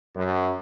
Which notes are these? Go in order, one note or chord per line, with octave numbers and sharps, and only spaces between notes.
F#2